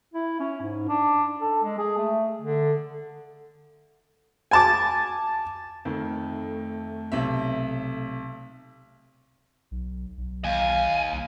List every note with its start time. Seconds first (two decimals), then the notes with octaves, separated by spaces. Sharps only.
0.14 E4
0.40 C#4
0.61 G#2
0.88 D4
1.41 A4
1.63 G#3
1.78 G#4
1.98 A3
2.42 D3
4.51 G#5 A5 D6
5.85 F2 D#3 A3
7.12 B1 C3 E5
9.71 B1
10.17 B1
10.44 D#2 F5 G#5
11.12 C2